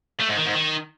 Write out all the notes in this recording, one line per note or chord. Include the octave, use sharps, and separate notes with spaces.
A3
G#2
D#3
G#2
D#3